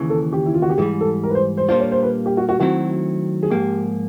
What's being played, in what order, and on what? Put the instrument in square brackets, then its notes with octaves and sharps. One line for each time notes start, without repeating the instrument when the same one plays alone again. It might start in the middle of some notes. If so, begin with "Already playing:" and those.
Already playing: [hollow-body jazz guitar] D#2 C#3 E3
[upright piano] A4
G4
E4
F4
F#4
G4
[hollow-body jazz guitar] G#2 E3 G3 [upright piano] G#4
[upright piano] A4
A#4
B4
C5
C5
[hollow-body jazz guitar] A#2 G3 A#3 D4 F4 [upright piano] C5
[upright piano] C#5
C5
B4
G4
F#4
F#4
[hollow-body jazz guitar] D#3 F#3 A3 C4 E4 [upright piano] F#4
[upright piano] G#4
[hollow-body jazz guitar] G#2 F3 A#3 [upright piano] G4